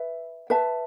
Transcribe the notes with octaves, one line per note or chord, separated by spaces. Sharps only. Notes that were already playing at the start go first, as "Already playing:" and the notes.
Already playing: B4 E5
B4 E5 A5